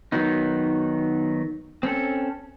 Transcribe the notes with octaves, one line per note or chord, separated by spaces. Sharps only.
D#3 F#3 B3 D#4
C4 C#4 A4